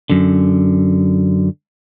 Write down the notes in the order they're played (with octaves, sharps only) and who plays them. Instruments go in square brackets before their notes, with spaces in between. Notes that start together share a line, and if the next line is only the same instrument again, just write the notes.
[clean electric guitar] F#2 D3